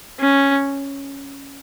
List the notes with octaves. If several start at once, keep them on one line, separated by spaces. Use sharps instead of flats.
C#4